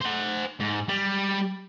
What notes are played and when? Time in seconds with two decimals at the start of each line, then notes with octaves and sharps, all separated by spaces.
0.01 C5 F#5
0.60 G#2
0.88 G3